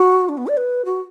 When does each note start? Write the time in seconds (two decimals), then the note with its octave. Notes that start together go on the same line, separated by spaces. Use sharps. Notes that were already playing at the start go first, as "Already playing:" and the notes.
Already playing: F#4
0.29 D4
0.37 B3
0.47 D5
0.57 B4
0.85 F#4